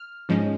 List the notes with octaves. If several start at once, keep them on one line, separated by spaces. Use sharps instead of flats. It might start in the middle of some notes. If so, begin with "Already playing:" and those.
Already playing: F6
G#2 F3 G#3 C#4